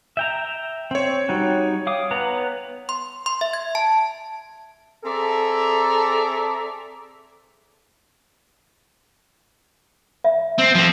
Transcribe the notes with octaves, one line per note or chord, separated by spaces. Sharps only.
E5 G5 A#5
C4 C#5 G5
G3 D#4 F#4
F5 D6 D#6
B3 B4 A#5
C6
C6
E5
G#6
A5
C4 G#4 A4 D5 E5 A#5
E5
C4
F3 C4